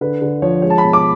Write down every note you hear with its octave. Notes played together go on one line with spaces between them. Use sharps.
D3 B4
D3
F3 C#5
G#3 C#5
A5
B5
B2
D6